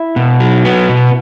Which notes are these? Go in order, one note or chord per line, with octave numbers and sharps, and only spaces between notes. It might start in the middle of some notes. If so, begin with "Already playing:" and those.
Already playing: E4
B2
F#3
B3
B2